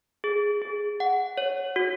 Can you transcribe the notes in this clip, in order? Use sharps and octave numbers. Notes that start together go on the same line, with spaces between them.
G#4
G#4
F#5
C#5
F#4